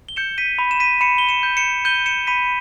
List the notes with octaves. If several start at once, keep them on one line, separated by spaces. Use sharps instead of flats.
G7
G6 C#7 E7
B6 D#7
B5
E7
B6 D#7
B5 C#7 E7
G7
C#7 E7
G6
C#7 E7
G6 D#7 G7
C#7 E7
B5 B6 D#7